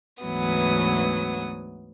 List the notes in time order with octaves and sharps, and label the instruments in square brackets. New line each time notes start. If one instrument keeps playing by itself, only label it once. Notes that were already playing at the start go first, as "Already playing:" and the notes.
[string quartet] D2 G#2 E3 F#3 B3 D#6